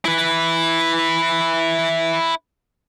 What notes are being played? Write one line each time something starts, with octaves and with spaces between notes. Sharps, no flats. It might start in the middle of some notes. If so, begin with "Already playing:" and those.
E4 B4